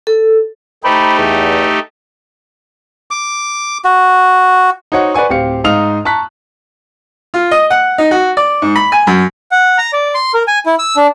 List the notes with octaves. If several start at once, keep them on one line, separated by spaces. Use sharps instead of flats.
A4
A3 D#4 G4 C5 A#5 B5
E2
D6
F#4
D#4 F#4 C5 C#5 D#5 F#5
B4 D5 F#5 G#5 C#6
D1 C4 G4 F5 C#7
G#2 D#4 F5 D#6 F6 F7
A5 A#5 C#6 F#6 B6
F4
D#5
F#5
D#4
F#4
D5
G#2
B5
G#5
F#2
F#5
A#5
D5
C6
A#4
G#5
E4
E6
D4